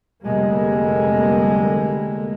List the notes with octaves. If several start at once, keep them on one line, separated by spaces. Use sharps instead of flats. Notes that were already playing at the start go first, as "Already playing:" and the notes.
F1 D3 G3 G#3 A#3